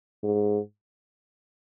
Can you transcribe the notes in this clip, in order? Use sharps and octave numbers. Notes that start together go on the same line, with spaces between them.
G#2